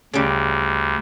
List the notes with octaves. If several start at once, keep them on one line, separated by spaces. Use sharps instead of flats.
D2 C#3 G3